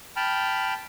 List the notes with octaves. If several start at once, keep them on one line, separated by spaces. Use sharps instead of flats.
G5 A5 B5 F6